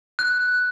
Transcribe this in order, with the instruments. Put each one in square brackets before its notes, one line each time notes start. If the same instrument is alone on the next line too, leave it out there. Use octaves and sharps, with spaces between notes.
[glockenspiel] F#6